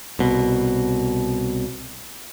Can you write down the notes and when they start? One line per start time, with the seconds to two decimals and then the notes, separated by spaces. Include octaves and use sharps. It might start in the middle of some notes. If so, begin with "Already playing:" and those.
0.19 C2 B2